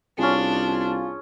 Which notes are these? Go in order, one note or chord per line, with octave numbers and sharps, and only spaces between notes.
C2 C#4 D4 F4 G#4